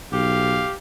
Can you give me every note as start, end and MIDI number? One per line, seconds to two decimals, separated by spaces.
0.12 0.65 35
0.12 0.73 67
0.12 0.75 77